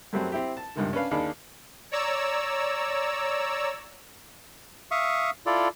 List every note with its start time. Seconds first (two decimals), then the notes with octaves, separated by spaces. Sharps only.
0.13 F#2 F#3 G3 A3 C4
0.32 C4 E4 G4
0.57 A5
0.76 C#2 G2 C3 D#3
0.93 C#4 D4 B4 F5
1.11 D#2 D4 G#4 F5 B5
1.92 C#5 D5 A#5 E6
4.91 E5 F5 C#6 D#6
5.46 E4 F4 A4 D5